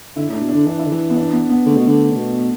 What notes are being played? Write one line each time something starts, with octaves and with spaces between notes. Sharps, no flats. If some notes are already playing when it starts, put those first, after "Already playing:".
D3 E4
A2 D4
B2
D4
D3
E3 D4
E4
D3
E3
B3
D4
B3
B3
D3 A3
B2
D3
D3
B2